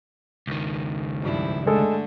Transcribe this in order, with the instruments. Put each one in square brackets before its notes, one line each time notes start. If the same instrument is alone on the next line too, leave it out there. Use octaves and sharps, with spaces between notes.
[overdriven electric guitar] C#2 D#3
[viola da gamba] G2 F3 E4
[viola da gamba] D3 A3 [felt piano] G#3 A4